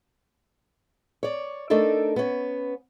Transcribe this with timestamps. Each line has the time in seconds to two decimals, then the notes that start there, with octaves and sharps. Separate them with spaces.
1.23 C#5 D5
1.70 A3 D4 D#4 A4 A#4
2.16 B3 C#4